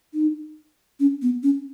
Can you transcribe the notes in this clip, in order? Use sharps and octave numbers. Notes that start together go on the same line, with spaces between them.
D#4
C#4
B3
C#4